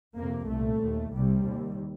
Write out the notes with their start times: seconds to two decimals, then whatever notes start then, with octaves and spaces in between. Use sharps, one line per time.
0.16 F2 C3 A#3
0.48 C2 A#2 A3
0.80 D#2
1.12 C2 C3 G3
1.44 D#2